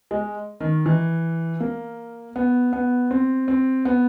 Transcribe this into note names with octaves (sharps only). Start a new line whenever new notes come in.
G#3
D#3
E3
A#3
B3
B3
C4
C4
B3